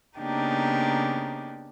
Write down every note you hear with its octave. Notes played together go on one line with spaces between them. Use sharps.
C#3 A#3 B3 D4 D#4 G4